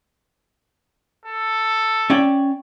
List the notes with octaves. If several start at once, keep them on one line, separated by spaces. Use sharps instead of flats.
A4
C#4 D5 G5